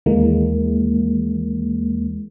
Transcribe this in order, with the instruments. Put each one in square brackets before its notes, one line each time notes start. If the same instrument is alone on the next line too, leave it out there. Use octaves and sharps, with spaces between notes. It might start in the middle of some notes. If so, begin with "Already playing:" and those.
[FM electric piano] D#2 E3 G#3 A#3